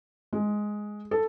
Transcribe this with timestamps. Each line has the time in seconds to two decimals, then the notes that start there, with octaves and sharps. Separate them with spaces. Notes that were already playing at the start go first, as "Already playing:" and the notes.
0.33 G#3
1.11 A4